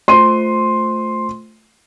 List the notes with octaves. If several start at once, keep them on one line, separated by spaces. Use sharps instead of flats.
A3 F4 C5 C6 D#7